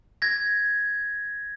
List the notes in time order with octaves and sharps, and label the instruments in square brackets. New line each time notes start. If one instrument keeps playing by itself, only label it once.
[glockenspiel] G#6 A#6